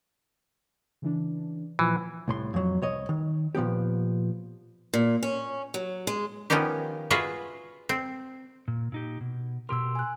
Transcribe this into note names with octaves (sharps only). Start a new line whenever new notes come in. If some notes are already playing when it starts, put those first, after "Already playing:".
C#3 E3 D4
A#2 E3 F3 F4
C2 A2 C6
F2 F#3
C2 C#5 D#5
D#3
A#2 F3 B3 G4
A#2
C#4
F#3
G#3
D#3 F3 B3 C#4 D#4 G4
F4 F#4 G#4 B4 E5
C4
A#2
A#2 D#4 G4
B2
B2 G4 A#4 C6 E6
G#5 F#6